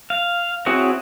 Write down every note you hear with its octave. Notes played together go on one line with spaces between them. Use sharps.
F5
C4 E4 F#4 G#4 C#5